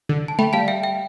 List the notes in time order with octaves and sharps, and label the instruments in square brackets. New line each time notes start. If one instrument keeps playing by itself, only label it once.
[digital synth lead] D3
[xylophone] A5
[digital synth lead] A3 [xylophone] G5 B5
[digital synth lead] G3 [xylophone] F5 A5
[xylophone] E5 G5
E5 G5